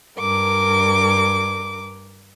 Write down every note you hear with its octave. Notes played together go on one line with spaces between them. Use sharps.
G2 A#4 D6